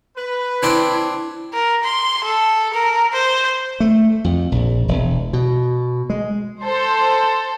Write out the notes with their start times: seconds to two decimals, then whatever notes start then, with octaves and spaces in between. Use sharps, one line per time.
0.17 B4
0.63 C4 D4 E4
1.53 A#4
1.84 C6
2.24 A4
2.73 A#4
3.13 C5
3.80 A3
4.24 F2
4.52 A#1
4.88 E1
5.33 B2
6.10 G#3
6.63 A4 C5